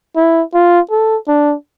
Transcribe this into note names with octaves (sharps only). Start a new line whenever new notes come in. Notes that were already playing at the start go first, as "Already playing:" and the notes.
E4
F4
A4
D4